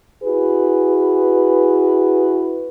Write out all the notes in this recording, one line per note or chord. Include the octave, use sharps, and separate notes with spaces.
E4 F#4 G#4 B4